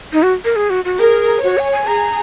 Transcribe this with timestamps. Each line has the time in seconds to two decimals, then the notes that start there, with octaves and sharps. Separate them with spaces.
0.13 D#4
0.23 F#4
0.45 A#4
0.56 G#4
0.70 F#4
0.85 F#4
0.99 G#4 A#4
1.43 F#4 C#5
1.58 G#5
1.72 G#5
1.87 G#4 A#5